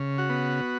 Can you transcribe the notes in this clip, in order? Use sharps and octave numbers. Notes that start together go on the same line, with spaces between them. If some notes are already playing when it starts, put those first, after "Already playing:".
Already playing: C#3
F#4
B3